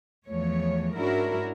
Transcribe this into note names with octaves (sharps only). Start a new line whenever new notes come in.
E2 E3 F3 A3 C#5
G#2 C#4 D4 E4 F#4 A#4